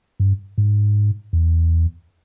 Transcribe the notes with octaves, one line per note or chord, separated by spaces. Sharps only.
G2
G#2
E2